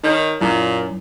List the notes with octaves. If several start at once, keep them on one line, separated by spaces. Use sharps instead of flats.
D#3 D#4 C#5
F#2 A#2 E4